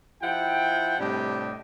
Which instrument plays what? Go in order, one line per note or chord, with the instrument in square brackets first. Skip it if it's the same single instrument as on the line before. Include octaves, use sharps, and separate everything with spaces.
[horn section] F3 E4 F#5 G5
A2 C3 G3 D4 G4 D#5